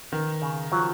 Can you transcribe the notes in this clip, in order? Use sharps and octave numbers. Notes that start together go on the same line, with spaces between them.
D#3 B3
C#3
F3 F#3